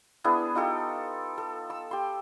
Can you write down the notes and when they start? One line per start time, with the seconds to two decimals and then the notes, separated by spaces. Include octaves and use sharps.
0.24 B3 D4 E4 G#4
0.55 D#4 F4 G4 A4
1.38 A4
1.70 E6
1.91 G4 C6